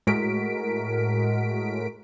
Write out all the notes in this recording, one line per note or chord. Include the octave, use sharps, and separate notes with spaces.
A2 G#3 F#4 A#4 B6 D7